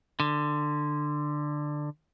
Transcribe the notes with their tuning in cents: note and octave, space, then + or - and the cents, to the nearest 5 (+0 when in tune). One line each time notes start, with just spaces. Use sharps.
D3 +15